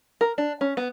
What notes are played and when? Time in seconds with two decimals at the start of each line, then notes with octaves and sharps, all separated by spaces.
0.21 A#4
0.38 D4
0.61 C#4
0.77 B3